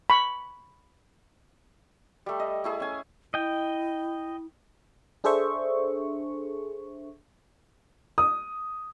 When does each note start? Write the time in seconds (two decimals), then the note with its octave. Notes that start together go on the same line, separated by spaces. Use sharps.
0.10 B5 C#6
2.26 G3 A3
2.40 D#5
2.64 A3 E4 G#4
2.80 C#4 G#5
3.34 E4 D#5 G5
5.24 D4 G#4 A4 C5 E5 C#6
8.18 D#6